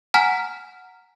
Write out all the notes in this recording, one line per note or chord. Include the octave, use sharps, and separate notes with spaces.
F#5 G#5 A#5 F6 B6